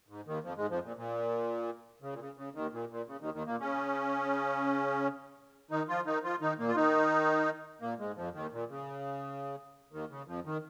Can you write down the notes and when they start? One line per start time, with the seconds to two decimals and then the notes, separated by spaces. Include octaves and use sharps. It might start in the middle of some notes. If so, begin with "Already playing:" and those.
0.09 G#2
0.26 D#2 D#3
0.44 F2 F3
0.57 G#2 G#3
0.70 F2 F3
0.84 A#2
0.97 A#2
2.02 C#3
2.13 A#2
2.19 C#3
2.37 C#3
2.55 D#2 D#3
2.73 A#2
2.90 A#2
3.07 C#3
3.20 D#2 D#3
3.34 D#2 D#3
3.47 A#2 A#3
3.60 C#3 C#4
5.71 D#3 D#4
5.88 F3 F4
6.06 D#3 D#4
6.23 F3 F4
6.41 D#3 D#4
6.59 A#2 A#3
6.68 F4
6.76 D#3 D#4
7.81 A#2 A#3
7.99 G#2 G#3
8.16 F2 F3
8.34 D#2 D#3
8.52 A#2
8.69 C#3
9.92 D#2 D#3
10.10 C#3
10.28 F2 F3
10.45 D#3